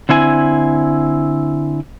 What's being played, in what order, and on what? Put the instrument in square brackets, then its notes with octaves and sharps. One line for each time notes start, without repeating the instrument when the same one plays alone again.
[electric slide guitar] D3 C4 E4 G#5